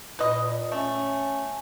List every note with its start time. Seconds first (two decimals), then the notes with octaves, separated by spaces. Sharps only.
0.19 A#2 B4 D#5
0.72 A3 C#4